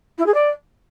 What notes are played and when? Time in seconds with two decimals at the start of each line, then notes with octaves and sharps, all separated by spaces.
0.18 E4
0.26 G#4
0.34 D5